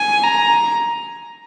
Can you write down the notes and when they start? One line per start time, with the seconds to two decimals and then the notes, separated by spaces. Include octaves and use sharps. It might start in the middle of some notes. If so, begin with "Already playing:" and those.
Already playing: G#5
0.24 A#5